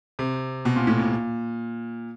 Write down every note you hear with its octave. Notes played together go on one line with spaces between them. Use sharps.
C3
B2
A#2
A2
A#2